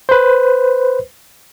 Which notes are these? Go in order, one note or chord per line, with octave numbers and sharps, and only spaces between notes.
B4 C5